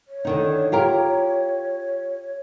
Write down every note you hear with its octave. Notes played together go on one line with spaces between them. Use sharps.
C#5
D3 D#3 D#4
F4 G4 A#4